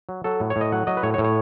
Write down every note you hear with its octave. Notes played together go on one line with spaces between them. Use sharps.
F#3
F#3 A4
A2
C#5
A2
D#5
F#3 F#5
F#3 D#5
B4
A2 C#5
C#5
A2
C#5